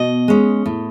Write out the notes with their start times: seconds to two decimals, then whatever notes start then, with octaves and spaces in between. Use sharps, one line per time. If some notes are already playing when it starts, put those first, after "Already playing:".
Already playing: B2 D#5
0.28 G#3 C#4
0.66 A2